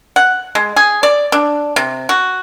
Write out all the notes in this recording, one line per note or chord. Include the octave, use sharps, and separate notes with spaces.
F#5
G#3
G#4
D5
D4
C3
F#4